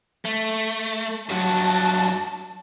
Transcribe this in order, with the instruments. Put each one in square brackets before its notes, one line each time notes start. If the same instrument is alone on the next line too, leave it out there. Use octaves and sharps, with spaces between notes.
[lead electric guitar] A3
[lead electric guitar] G2 F#3 [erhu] A5